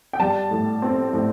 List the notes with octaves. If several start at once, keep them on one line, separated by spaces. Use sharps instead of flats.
G5
G3 A5
A2
C4
A2